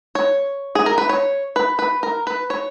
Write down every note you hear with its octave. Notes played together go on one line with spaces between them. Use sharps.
C#5
G#4
A#4
B4
C#5
B4
B4
A#4
B4
C#5